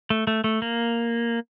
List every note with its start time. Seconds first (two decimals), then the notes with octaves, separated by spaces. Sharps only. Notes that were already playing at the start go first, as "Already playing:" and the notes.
0.10 A3
0.27 A3
0.44 A3
0.62 A#3